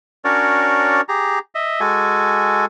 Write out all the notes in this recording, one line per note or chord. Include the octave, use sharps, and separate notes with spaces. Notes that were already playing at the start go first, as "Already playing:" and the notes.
C#4 D4 F#4 A#4 C#5 D5
G4 G#4 A#5
D#5 E5
G#3 F#4 A4 G#5